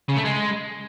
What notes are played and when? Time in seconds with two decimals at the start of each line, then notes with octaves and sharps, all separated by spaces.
0.09 C#3
0.17 A3
0.25 G#3